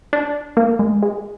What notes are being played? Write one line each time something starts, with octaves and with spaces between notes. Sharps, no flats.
D4
A#3
G#3
G#3